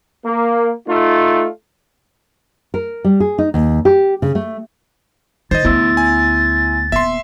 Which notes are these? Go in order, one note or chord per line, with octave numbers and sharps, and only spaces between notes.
A#3
A3 D#4 F4
A#4
G3
G#4
D#4
D#2
G4
C#3
A3
D#3 C5 D#5 A6
A1 D2 B3 E4 C6 E6
G#5
D#1 B3 E5 C6